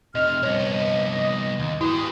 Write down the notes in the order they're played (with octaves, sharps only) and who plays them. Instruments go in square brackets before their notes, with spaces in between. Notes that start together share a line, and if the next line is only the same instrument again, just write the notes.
[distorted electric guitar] F2 C3 [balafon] D#5 [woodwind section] F6
[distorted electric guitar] C2 B3 [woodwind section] G2 F3 D#5 [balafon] C#5
[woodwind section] D#5
[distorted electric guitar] D#2
[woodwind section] E3 F#4 D#6 [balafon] E4 [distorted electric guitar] G4 B4